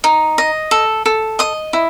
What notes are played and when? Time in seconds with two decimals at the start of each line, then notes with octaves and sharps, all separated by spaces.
0.04 D#4
0.38 D#5
0.71 A4
1.06 A4
1.39 D#5 D#6
1.73 E4